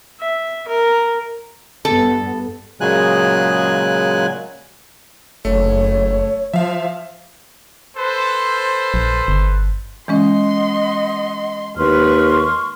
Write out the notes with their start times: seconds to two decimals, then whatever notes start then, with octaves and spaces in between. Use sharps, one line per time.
0.20 E5
0.68 A#4
1.85 G2 B3 A4
2.81 A#2 C#3 F#3 G#3 G#5 F#6
5.45 F#1 A3 C#5
6.53 F3 E5 F5
7.97 A4 B4 C5
8.94 A#1
9.28 G1
10.08 E3 G#3 C#4 D#5 F#5 C6
11.77 D#2 B4 C6 C#6 F6